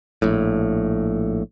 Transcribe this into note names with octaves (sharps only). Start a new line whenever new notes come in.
A#1 A2